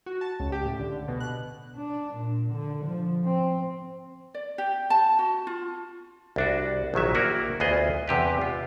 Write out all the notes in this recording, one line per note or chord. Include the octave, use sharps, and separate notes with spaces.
F#4
A5
C#2
G4
A2
D3
D3
B2
F#6
D4
A#2
D3
F3
C4
D5
G4
A5
F#4
F4
C2 D4 F#4
A#1 D#3 F#3 E5
A#3 E4 F#4 A#4
D2 B3 F4 G#4 D#5
E2 C3 G4 B4
F4